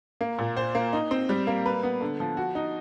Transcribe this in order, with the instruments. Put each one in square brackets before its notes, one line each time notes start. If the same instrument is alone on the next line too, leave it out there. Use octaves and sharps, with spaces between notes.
[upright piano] A#3
A#2
C5
A#3
D#4
C4
G3
A#3
B4
B3
D3
F3
F#4
D#4